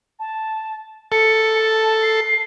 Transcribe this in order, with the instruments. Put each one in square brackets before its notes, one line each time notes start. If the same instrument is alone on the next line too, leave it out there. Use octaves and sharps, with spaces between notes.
[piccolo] A5
[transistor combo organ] A4 [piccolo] C#7
[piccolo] A5
C7